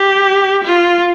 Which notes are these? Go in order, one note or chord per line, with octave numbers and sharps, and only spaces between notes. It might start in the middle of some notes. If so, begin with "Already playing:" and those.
Already playing: G4
F4